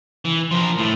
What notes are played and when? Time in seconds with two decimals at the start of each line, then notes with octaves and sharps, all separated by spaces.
0.25 E3
0.51 F3 A#4
0.78 A2 A3